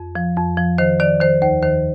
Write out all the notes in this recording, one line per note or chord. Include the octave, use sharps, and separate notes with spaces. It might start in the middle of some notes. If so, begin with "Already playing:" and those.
Already playing: F2
F3
F2
F3
D#3 C5
D#3 D5
D#3 C5
D#2 C5
D#3 C5